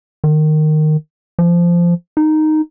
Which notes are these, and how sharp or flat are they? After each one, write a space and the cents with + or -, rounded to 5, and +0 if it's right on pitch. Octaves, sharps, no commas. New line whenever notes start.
D#3 -15
F3 -15
D#4 -5